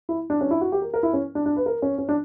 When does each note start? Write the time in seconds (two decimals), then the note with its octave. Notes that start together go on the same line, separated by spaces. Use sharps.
0.09 E4
0.30 D4
0.41 C#4
0.46 D4
0.51 E4
0.61 F#4
0.72 G4
0.82 A#4
0.94 A#4
1.03 E4
1.13 C#4
1.35 D4
1.46 D4
1.56 B4
1.66 A#4
1.82 C#4
1.98 C#4
2.09 D4